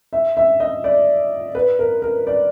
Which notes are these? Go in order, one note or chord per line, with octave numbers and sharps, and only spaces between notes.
E5
E5
D#5
D5
B4
A#4
A#4
D5